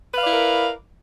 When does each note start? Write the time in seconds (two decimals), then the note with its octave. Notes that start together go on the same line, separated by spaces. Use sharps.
0.14 B4
0.18 F5
0.22 D5
0.26 E4
0.30 A#4